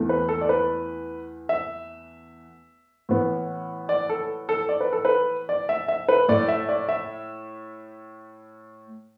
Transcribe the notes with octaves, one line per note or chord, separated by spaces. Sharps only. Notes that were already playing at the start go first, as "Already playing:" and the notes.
Already playing: E2 E3 A3
B4
A4
D5
B4
E5
A2 E3 B3
D5
A4
A4
D5
B4
A4
B4
D5
E5
E5
B4
A2 A3 D5
E5
D5
E5